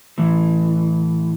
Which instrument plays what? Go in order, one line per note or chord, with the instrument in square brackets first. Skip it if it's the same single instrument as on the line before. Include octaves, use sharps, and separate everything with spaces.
[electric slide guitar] A2 E3